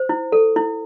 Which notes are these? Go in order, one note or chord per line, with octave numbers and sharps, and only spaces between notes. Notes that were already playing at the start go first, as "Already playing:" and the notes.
Already playing: C5
E4
A4
E4